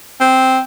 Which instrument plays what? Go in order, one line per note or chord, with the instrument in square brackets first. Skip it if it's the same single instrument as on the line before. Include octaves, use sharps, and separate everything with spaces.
[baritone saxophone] C4